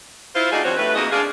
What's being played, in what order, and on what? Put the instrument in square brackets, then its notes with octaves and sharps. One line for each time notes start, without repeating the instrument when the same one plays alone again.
[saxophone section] E4 F4 C5
A3 D4 D#4 F4 F#4 G#4
G2 F3 C4 F#4 C5 C#5
G2 A3 E4 B4
F2 A#3 D#4 F#4 G#4 D#5
D4 F4 G#4